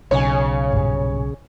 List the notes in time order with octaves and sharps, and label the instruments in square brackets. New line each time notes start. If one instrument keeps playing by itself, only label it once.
[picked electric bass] B1 [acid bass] C#3 [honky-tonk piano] C#5 G#5
[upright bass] G2 A#2